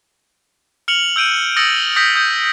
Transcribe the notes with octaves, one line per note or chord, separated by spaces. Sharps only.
F6 C#7 F7 F#7
E6 G6 D7 D#7
D#6 E6 A6 A#6 C#7 F#7
D#6 G6 A#6 B6
D#6 G6